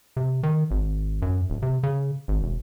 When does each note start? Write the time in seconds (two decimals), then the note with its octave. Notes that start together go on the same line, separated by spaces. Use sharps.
0.17 C3
0.43 D#3
0.71 G#1
1.22 F#2
1.50 D1
1.62 C3
1.83 C#3
2.28 G#1
2.43 E1